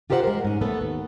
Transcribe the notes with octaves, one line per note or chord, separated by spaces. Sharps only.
F4 G4 A#4 C5 D#5 F#5
G#3 A#4
G#2 C#4
A3 B3 A4
D#2